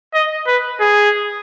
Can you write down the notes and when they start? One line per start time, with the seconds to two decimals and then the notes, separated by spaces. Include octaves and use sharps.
0.14 D#5
0.47 B4
0.80 G#4